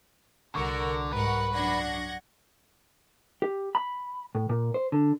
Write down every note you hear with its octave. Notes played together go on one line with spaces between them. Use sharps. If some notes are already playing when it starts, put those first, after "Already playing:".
C2 D3 F#4 A#4 C#6
G#2 G3 A#4 B4 F#5
F#2 D4 F#5 G#6 A#6
G4
B5
A2
A#2
C5
D3